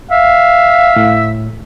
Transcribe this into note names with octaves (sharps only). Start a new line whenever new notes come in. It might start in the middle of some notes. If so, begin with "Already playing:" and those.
E5 F5
A2